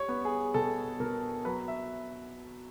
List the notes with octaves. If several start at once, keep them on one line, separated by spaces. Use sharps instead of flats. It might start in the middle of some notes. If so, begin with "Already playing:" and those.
Already playing: G3 C#5
B3
G#4
B2 A4
B2 A#4
F#3 B4
E5